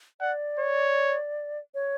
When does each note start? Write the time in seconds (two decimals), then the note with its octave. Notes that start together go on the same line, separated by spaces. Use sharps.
0.21 D5 F#5
0.59 C#5
1.74 C#5